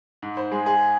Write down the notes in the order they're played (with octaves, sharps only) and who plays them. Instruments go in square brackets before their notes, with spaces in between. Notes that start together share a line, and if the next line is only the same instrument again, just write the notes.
[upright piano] G#2
C5
G#3 G#4
G#4